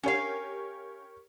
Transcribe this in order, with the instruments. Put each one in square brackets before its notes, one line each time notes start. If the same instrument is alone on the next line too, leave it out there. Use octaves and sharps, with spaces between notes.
[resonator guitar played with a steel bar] C#4 F5 [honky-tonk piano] G4 A#4 C#5